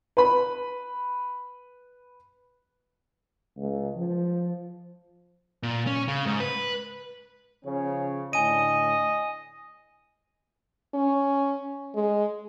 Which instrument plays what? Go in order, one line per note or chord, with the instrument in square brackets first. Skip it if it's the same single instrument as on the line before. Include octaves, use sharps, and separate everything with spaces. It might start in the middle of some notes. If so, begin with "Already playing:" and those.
[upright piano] B4 B5
[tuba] C#2
F3
[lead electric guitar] A#2
C#4
C#3
G#2
B4
[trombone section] C#3 F3 C#4
[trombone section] A2 D3 [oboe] D#5 [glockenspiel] G#5 D#7
[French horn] C#4
G#3